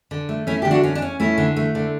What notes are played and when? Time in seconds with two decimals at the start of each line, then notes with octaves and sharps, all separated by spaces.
0.11 D3
0.29 A3
0.47 A3 C#4 E4
0.62 D3 G4
0.71 D4 F#4
0.83 C#4
0.95 D4
1.02 C#4
1.20 A3 C#4 E4
1.38 D3
1.56 A3
1.75 D3